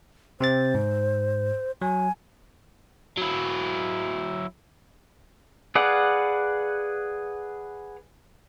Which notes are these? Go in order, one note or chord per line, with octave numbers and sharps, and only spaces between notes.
C3 C4 C5 A6
G#2
F#3 G#5
F#3 E4
G#4 B4 D5 F5 F#5